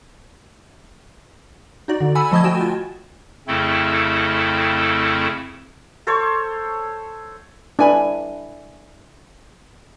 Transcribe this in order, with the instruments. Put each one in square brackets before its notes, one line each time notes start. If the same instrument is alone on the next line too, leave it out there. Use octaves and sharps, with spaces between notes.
[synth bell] D#4 F#4 D5
D3
F#5 G#5 B5 E6
F3 A3 D#5 A5 D#6 G#6
F#4 G5 G#5 E7
F4
[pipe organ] F2 C#3 A3 C4 E4 A4
[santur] A4 C5 C#5 C#6
[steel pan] D4 E4 B4 [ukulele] E5 G#5 B5